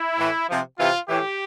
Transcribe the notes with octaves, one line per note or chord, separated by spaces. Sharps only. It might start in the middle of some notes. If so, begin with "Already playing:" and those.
Already playing: E4
A2 E3
C3 F3
C3 E3 F4
A2 E3 G4